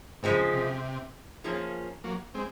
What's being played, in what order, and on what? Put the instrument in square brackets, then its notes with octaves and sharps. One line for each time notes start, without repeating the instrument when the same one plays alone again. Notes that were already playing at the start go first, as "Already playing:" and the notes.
[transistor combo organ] G#2 [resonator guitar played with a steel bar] C#3 F3 G#3 C4
[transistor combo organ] C3
[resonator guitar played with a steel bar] F3 A#3 C#4 F4 G#4
[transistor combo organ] F#3 A#3
G#3 C4